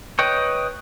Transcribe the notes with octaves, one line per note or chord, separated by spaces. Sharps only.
B4 C#5 D#5 G5 C#6